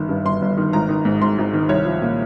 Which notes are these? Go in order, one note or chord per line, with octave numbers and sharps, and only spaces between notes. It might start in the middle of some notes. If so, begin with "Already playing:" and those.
Already playing: G1 D#3
G2
G1 C6
G1
D#3
G#1 A#5
D#3
G#2
G#1 C6
G#1
D#3
C2 C#5
F3
A#2